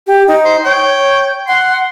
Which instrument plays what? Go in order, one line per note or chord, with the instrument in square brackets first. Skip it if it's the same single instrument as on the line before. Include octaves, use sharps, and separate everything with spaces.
[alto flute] G4
D#4
[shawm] C5
[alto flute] C#5 [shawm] G5
[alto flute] F#5 [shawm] C6